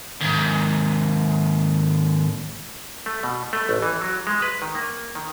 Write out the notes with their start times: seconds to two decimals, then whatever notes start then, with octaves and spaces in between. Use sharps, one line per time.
0.20 D#2 G#2
3.06 A3
3.23 B2
3.53 A3
3.69 A1
3.83 E3
4.02 F#3
4.27 G#3
4.42 B4
4.62 D#3
4.75 A#3
5.15 D#3